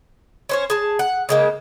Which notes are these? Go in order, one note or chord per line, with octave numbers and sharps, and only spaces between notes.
C#4 C5 C#5
G#4 A5
F#5
C#3 G#3 A#3